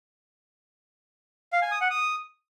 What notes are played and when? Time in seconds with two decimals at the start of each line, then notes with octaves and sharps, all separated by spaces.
1.53 F5
1.62 G#5
1.71 D#6
1.81 F#5
1.90 D#6